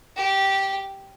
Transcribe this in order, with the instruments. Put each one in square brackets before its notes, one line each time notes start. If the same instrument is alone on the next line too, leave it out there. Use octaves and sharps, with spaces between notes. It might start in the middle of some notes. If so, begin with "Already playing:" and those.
[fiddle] G4